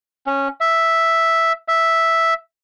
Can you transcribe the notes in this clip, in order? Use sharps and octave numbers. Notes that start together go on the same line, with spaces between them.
C#4
E5
E5